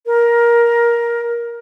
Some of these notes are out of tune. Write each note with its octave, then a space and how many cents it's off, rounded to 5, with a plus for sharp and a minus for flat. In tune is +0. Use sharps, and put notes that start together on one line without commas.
A#4 +15